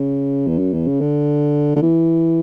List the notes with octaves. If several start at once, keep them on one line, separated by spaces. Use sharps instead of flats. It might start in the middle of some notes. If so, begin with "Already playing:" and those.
Already playing: C#3
E2
F#2
E2
C#3
D3
D3
E3